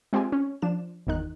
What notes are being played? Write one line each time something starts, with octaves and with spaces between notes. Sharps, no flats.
G#3 C4 F4 G4 G#5
C#4
F3 D4 E7
G1 E2 D#3 D#4 F#6